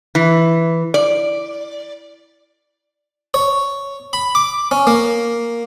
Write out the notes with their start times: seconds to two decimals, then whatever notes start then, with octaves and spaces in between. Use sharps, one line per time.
0.15 E3
0.94 D5
3.34 C#5
4.13 B5
4.35 D6
4.71 C#4
4.87 A#3